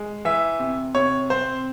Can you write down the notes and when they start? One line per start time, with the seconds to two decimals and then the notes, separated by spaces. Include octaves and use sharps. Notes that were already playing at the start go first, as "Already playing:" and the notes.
Already playing: G#3
0.25 E3 E5
0.59 C3
0.95 C3 C#5
1.30 C4 C5